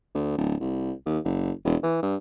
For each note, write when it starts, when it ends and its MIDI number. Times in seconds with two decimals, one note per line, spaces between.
0.15 0.36 38
0.38 0.55 26
0.61 0.92 36
1.06 1.19 39
1.24 1.51 30
1.65 1.76 28
1.83 1.99 52
2.03 2.16 43